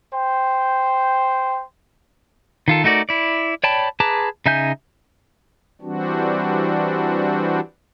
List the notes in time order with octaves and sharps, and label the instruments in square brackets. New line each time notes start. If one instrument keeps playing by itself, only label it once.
[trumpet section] C5 G5
[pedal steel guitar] D#3 F4 A4
A3 D#4 F#4 A#4 D5
E4 D5
C#5 D5 G5 A5 B5
G#4 B4 A5 A#5 D6
C#3 D#4 E5 G#5 G6
[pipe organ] E3 G3 C4 D4 F#4